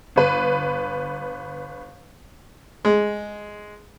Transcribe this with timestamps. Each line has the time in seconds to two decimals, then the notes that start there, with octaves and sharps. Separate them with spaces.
0.16 G1 B4
2.85 G#3